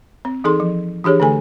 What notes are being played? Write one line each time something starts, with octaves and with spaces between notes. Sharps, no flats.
C4
E3 D#4 G#4 A4 C6
F3
E3 D4 G4 G#4 C#5
D3 A3 A4 G#5